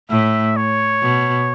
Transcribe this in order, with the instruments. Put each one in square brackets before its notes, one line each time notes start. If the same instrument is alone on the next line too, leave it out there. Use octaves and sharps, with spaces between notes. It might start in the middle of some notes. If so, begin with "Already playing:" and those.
[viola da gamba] A2 [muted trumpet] E5
[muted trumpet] C#5
[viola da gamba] B2